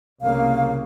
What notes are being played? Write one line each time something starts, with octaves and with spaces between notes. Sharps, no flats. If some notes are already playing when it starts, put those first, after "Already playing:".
C2 C#3 A#3 F5